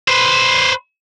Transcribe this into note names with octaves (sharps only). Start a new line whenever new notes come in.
B4 C5